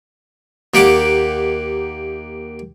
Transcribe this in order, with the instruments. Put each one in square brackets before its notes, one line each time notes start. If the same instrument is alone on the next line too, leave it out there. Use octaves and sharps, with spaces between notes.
[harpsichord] D#2 A#3 G4 F#5 G5 D6